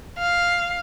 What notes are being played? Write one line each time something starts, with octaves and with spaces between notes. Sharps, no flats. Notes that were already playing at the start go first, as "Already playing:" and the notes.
F5